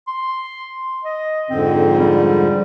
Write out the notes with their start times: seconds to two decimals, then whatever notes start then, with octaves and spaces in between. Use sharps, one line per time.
0.08 C6
1.04 D#5
1.50 F2 G#2 D3 C4
2.00 G3